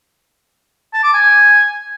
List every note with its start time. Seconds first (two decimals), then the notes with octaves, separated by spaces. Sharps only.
0.94 A5
1.03 D6
1.13 G#5